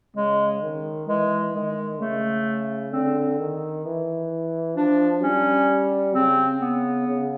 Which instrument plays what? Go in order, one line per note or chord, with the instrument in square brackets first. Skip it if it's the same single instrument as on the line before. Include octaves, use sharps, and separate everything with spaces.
[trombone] C#3 [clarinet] G#3
[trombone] D#3
[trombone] E3 [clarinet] G#3
[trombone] D#3 [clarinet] G#3
[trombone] C#3 [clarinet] A3
[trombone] D3 [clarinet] C4
[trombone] D#3
E3
[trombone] F3 [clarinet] D4
[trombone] G3 [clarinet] C#4
[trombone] C#3 [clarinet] C4
[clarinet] B3
[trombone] C#3